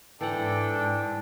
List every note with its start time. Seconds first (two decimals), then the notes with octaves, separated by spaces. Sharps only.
0.21 G#2 E3 D4 A4 F#5 G5 A5